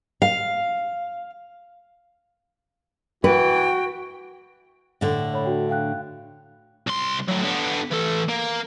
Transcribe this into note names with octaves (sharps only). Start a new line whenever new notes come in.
F5
E3 F#4 B4 G5
A2 D3
C#5 B5
D4 F#4 G5
F5 G5 F#6
C2 C6
A2 F#3
D3 B3
E3 A4
A#3